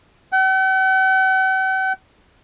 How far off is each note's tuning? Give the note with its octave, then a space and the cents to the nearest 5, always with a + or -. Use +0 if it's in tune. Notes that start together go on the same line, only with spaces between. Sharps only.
F#5 +45